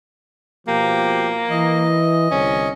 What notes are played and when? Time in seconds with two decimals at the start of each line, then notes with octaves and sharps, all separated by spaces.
0.68 B2 F3 A#3 G4
1.50 E3 D#5
2.31 C2 D3 C#4